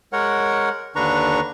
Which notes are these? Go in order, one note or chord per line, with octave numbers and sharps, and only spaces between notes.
G#3 A#4 C#5 F#5
D#2 D3 D4 B4 A#5 C#6